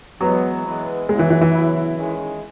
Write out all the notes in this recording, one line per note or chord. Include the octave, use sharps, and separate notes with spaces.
E3 F#3 G#3 B3
E3 G#3 B3
C#3 F#3 G#3 B3 E4
E3
E3
E3
C#3 F#3 B3 E4
D#3 G#3 C#4 E4 G#4